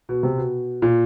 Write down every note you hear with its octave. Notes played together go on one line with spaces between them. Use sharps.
B2
C3
B2
A#2